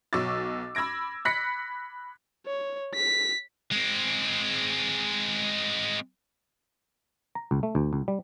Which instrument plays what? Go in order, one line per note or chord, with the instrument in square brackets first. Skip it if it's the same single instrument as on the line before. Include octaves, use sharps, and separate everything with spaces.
[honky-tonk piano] B1 F#3 C#6 D6 E6 A6
B5 E6 G#6 A#6 D7
B5 F#6 A#6 B6 C#7
[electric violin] C#5
B6
[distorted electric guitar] G#3 C4
[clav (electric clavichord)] A#5
C#2
A3
D2
C#2
G3